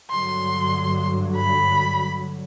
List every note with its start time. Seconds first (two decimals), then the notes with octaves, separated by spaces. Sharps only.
0.10 G2 D3 F#3 C6
1.36 B5